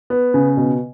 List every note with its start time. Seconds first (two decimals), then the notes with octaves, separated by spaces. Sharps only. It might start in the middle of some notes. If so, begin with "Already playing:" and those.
0.10 B3
0.34 C#3
0.57 B2